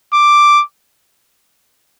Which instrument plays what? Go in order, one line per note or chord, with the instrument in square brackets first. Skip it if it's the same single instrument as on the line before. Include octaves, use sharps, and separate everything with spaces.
[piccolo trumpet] D6